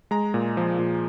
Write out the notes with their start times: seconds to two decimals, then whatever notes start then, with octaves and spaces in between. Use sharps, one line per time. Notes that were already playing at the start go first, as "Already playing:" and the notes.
0.11 G#3 A#5
0.34 A#2
0.57 F3
0.79 A#2